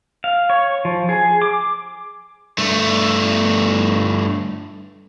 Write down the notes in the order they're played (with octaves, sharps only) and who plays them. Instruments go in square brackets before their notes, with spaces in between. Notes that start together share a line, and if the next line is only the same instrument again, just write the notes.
[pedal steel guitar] F5
C#5
F3
G#4
D6
[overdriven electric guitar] G2 A3